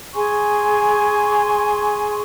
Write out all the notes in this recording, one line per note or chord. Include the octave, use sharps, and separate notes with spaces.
G#4 G#5 C6 C#6